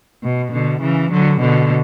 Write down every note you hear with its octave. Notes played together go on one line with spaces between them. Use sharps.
B2
B2 D3
C#3 E3
D3 F#3
B2 D3